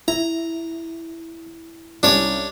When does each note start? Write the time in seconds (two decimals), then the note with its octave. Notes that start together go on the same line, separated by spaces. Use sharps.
0.08 E4 A#5
2.03 C2 C#4 D4 C#5